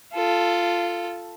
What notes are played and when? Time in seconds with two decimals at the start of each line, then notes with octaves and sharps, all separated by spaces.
0.13 F4 A4